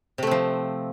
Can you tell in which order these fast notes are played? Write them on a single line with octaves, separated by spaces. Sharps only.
C3 A3 C4 F3